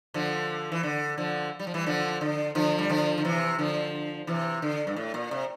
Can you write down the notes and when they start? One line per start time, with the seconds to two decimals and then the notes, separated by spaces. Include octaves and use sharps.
0.14 D3 F3
0.72 E3
0.83 D3
1.18 D3 F3
1.59 G3
1.67 F3
1.74 E3 G3
1.86 D3 F3
2.21 D3
2.55 D3 F3
2.78 G3
2.90 D3 F3
3.18 D3
3.24 C3 E3
3.58 D3 F3
4.27 C3 E3
4.62 D3
4.87 G2
4.96 A2
5.14 A#2
5.31 C3